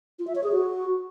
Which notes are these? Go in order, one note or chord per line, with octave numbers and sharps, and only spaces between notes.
F4
E5
C#5
G#4
F#4